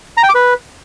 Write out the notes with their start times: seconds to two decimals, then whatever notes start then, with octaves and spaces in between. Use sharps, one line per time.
0.17 A#5
0.23 G5
0.29 D6
0.35 B4